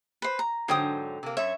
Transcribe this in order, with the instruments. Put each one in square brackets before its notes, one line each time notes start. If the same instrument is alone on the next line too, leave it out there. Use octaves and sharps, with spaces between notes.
[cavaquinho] B4 C5
A#5
[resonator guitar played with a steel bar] G#2 D3 F#3 [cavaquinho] C5 G5 D#6
[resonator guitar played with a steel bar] C3 A#3
[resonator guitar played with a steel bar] F#2 C#5 [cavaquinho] E5